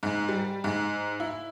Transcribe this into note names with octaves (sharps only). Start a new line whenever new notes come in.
G#2
G3
G#2
E4